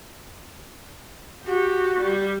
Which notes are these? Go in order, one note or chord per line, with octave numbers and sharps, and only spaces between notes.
F#4 G4
G3